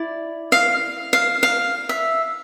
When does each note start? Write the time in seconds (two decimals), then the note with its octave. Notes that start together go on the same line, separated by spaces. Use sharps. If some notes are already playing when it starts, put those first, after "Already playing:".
Already playing: E4 D5
0.52 F5
1.13 F5
1.43 F5
1.89 E5